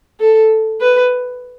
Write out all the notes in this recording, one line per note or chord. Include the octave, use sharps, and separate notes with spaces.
A4
B4